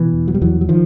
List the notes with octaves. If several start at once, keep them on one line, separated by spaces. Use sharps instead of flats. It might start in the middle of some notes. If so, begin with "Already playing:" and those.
Already playing: B2 E3
E2
F#3
G3
E2 E3 F#3
F#3
D#3 F3